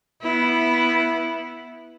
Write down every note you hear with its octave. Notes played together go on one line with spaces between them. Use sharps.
B3 E4